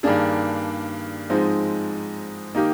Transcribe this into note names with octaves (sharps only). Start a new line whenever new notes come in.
G2 D#3 A#3 D4 G#4
G#2 F3 G#3 C4 D#4
D#3 A#3 D#4 G4